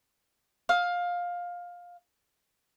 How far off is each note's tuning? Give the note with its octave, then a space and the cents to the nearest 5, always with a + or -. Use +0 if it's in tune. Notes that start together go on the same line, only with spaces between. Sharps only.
F5 +15 D#6 +45